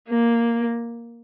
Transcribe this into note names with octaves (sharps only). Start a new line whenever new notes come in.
A#3